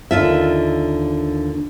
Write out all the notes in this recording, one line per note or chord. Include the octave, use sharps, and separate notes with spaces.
D#2 D3 F4 E5